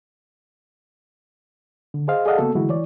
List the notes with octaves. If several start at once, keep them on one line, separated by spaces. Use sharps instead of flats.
D3
G#4 C5 D#5 F5
G#4 A4 D5 D#5 F5 F#5
C#3 A#3 B3 F#4 A4
D3 E3 F#3 G#3 E4 F#4
E3 C#5 D5